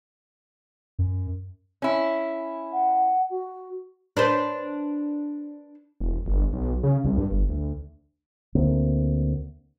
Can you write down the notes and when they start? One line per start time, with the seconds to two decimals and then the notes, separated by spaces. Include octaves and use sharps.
0.99 F#2
1.82 C#4 E4
2.72 F#5
3.29 F#4
4.17 D4 B4 C5
6.01 E1
6.26 G1
6.53 B1
6.83 C#3
7.04 C2
7.17 G2
7.31 G1
7.49 D2
8.55 D2 D3 A#3 C4